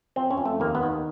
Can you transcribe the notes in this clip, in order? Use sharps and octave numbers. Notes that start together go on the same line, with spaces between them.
F2 C4
C#4
F2
A3
D#2 A#3
B3
D#3